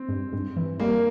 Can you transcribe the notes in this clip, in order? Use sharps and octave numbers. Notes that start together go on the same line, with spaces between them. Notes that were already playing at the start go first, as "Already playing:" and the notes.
Already playing: C4
G2
G2
E3
G3 A#3